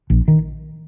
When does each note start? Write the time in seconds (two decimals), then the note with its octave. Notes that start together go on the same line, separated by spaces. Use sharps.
0.10 A#1
0.28 D#3